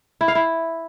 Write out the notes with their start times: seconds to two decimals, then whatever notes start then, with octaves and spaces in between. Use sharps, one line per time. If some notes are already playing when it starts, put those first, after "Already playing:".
0.21 E4
0.28 F5
0.35 E4